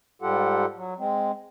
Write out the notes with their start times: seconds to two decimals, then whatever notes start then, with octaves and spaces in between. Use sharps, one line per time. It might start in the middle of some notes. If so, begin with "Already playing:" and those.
0.22 G#2 G3 F4 G4 A4 F#5
0.76 F#3
0.99 G#3 C4